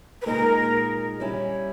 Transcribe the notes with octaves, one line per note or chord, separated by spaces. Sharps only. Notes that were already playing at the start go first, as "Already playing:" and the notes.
B4
A#2 G#3 D#4 A#4
G3 C#4 E4